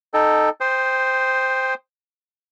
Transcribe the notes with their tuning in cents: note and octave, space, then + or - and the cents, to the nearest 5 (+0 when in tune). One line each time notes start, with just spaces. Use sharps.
D#4 -15 A4 +0 G5 +0
C5 +0 G5 +15 D#6 +0